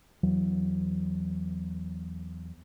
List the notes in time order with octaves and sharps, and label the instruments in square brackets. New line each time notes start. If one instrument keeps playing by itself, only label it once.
[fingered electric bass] E2 E3 F#3